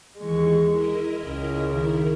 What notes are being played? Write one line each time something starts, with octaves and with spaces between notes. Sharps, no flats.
D#2 E3 G#3 C#6
E4 A#4 D#5
C#2 C#3
D#3 E4 A#4